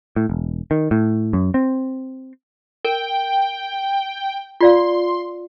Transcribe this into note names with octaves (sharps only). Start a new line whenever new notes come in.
A2
E1
D#3
A2
F#2
C4
A#4 G5
F4 D5 F5 C6